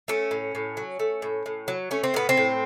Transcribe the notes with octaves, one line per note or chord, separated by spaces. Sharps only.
A3 C#4
A2
A2
F#3
A3
A2
A2
F#3
A3 C#4
C4
A2 B3
C4
A2